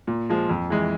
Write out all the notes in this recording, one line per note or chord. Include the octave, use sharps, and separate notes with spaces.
A#2
F3 G#3
F2
E3 G#3